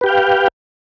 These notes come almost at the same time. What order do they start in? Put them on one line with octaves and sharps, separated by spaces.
B4 G4 G5 F5